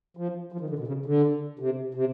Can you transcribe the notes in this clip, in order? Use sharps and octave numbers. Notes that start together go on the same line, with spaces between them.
F3
F3
D#3
D3
B2
C#3
D3
C3
C3